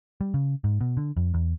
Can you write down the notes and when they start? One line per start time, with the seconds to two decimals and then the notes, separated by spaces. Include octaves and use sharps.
0.21 G3
0.34 C#3
0.64 G#2
0.81 B2
0.97 D3
1.17 F2
1.34 E2